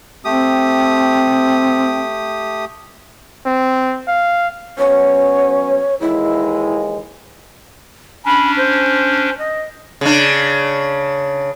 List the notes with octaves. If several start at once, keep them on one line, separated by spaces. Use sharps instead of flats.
A3 C4 G4 D#6
C4
F5
F#3 B3 C#4 C#5
D#2 E3 G#3 E4
C#4 D4 B5
C5
D#5
C#3 D4